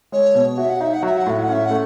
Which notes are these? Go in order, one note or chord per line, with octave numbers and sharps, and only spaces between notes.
G#3 C#5
B2
F#4 E5
F#5
D#4 E5
F#5
F#3 E5
F#5
A2 E5
F#5
C#4 E5
F#5
A3